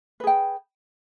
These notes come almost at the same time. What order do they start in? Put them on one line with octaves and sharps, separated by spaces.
B4 G#4 G5